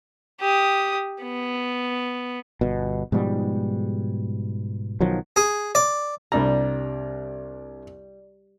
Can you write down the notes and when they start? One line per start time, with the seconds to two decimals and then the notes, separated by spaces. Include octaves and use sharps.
0.40 G4 D#6
1.22 B3
2.61 G1 B2
3.12 G#2 B2 F3 G3
5.01 B1 D#3 F3 F#3
5.36 G#4
5.75 D5
6.32 C2 G3 D4 A#5